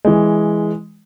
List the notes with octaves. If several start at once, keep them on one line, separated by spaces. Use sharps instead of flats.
E3 G#3